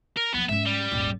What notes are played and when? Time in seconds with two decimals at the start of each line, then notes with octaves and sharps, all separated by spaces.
0.17 A#4
0.34 D#2 F3 B3
0.49 G#2 C#4 E5
0.66 G3
0.92 D#1 G#1